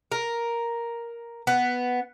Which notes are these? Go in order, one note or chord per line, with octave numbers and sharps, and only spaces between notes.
A#4
B3